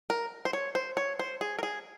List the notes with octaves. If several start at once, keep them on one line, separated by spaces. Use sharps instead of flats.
A#4
C5
C#5
C5
C#5
C5
G#4
A#4
G#4